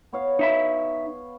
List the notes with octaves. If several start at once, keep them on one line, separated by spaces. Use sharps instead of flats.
B3 C#5 F5
D#4 E5 B5